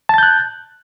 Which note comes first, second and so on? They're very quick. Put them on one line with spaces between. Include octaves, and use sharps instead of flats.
A5 A6 G6 F#6